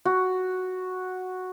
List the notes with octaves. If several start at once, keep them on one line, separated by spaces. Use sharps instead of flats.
F#4